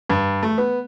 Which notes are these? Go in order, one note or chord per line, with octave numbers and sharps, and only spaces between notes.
G2
A3
B3